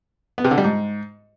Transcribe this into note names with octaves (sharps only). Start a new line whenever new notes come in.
B3
C3
D3
G3
G#2